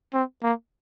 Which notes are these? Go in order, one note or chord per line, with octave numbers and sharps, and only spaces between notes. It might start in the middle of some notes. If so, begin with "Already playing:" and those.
C4
A#3